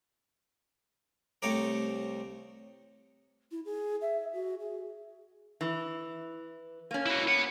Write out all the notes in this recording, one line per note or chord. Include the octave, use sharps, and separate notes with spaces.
C2 A3 C4 C#5 A#5 D6
E4
G#4
E5
F#4
G#4
E3
A#3 C#4
E4 F#4
B4 F#5